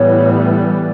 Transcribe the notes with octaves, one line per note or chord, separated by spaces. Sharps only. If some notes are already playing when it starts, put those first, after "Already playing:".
Already playing: A2 E3 G3 B3 C#5
D5